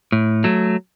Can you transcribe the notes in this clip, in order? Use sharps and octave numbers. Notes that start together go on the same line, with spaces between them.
A2
F#3 A3